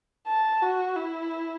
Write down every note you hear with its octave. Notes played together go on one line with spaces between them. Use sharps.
A5
F#4
E4